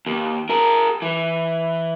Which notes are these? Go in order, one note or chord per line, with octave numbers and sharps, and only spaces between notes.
D#2
G#4 A#4
E3